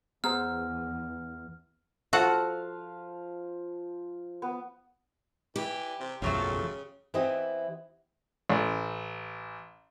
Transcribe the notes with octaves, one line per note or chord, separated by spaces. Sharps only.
E2 B3 G#4 C5 A#5 F6
F3 F#4 A4 F5 F#5
B3
E3 G4
C3
F#1 B1 E2 C#3 F3 F#3 A3
E3 B3 C4 E4 G4 D#5
A1